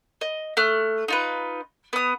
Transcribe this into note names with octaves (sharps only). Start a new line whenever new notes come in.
D#5
A3 F6 F#6
D#4 F4 B4
B3 D#6